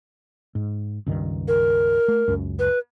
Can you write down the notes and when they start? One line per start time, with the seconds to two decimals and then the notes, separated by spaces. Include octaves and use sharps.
0.55 G#2
1.06 C#2 G2 D#3
1.48 A#4
2.08 A3
2.28 C#2 F#2
2.59 B4